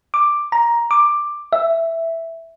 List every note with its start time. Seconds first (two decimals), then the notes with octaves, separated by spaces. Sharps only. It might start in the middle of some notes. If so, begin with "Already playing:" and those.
0.14 D6
0.52 A#5
0.91 D6
1.53 E5